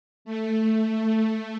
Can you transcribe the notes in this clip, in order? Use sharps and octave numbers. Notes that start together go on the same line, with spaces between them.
A3